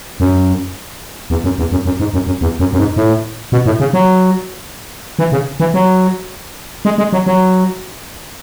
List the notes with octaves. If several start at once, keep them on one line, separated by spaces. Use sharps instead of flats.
F#2
E2
F#2
E2
F#2
F#2
G#2
F#2
F#2
E2
F#2
F#2
G#2
A2
B2
A2
C#3
F#3
E3
C#3
E3
F#3
G#3
G#3
F#3
F#3